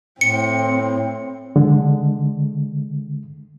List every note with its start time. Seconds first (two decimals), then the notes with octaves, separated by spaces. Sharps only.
0.21 A2 C4 C#7
1.56 D3 G#3